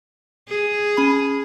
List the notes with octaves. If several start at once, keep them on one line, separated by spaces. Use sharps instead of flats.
G#4
C#4 B5